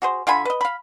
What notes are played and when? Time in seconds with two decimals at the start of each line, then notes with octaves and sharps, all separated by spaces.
0.02 F#4 G#4 C5
0.27 D3 F4 G#5 B5
0.45 B4 D#5
0.61 F5 B5